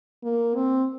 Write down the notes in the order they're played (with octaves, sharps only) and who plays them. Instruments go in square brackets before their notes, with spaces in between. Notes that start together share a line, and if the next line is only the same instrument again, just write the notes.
[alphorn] A#3
C4